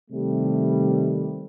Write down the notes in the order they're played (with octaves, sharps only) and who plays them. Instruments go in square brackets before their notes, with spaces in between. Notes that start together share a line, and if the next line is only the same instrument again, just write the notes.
[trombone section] C3 D#3 G3 A3